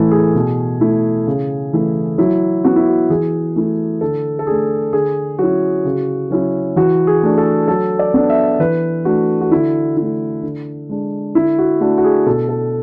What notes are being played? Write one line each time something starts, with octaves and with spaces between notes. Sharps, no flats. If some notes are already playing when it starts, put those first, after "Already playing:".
Already playing: A2 E3 A3 E4 A4
G#4
B2
A3 E4
C#3
E3 A3 E4
F#3 E4
B3 E4 F#4
E4
F#4
E3 G#4
A3 E4
D3 A4
A4
A3 D4 G#4
D3 G#4
F#3 C#4 E4 F#4
C#3
F#3 C#4 E4
E3 F#4
G#4
A3 D4
A4
F#3 A4
D5
B3 D4
E5
E3 B4
A3 D4 F#4
F#4
D3 E4
A3 E4
D3
G#3 D4
D3 E4
F#4
A3 D4 F#4
F#4
G#4
B2 A4
A4